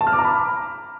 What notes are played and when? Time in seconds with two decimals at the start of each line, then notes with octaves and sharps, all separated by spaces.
0.01 A5
0.07 F6
0.13 D6
0.19 A#5
0.24 B5